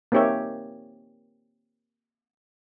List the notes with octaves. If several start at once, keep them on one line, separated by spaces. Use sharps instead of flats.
A#3 C4 D#4 G4 C#5 E5